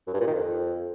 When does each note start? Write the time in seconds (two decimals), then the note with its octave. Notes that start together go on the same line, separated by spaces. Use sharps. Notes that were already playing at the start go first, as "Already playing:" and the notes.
0.07 F#2
0.14 G2
0.21 A#2
0.27 D#3
0.34 F2